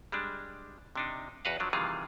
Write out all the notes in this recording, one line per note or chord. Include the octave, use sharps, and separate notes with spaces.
G3 G#3 D4
C3 D4 D#4
E2 F#4 B4 F5
F3 F#3 D4
C3 D#3 E3 G3 F4 G#4